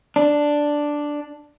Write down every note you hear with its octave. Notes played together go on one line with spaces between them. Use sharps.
D4